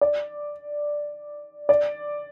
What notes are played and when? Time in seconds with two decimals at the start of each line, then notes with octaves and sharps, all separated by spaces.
0.01 D5
1.69 D5